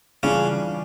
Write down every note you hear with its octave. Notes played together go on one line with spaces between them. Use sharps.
C#3 E3 G3 C#4 D4 F4